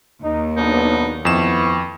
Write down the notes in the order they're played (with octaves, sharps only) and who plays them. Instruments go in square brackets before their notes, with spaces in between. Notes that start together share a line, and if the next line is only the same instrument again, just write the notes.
[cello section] D#2 [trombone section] D#4
[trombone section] B1 B3 D4 [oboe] D#4
[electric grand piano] F2 E7 [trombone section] B3 C4 E4 [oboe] C#6